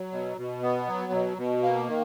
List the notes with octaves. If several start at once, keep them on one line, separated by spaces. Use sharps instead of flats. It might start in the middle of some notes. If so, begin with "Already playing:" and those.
Already playing: F#3
B2
B2
B3
F#3
B2
B2
A#3
D#3